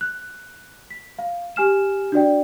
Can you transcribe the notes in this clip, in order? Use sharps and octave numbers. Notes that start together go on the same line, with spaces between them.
F#6
B6
F5
G4 G#5 F6 E7
D4 F#4 D5 G5